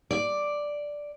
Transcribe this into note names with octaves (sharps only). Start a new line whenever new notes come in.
D5